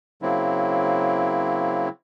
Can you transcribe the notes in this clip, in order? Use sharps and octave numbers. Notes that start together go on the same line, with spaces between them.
C#3 F#3 A#3 C4 E4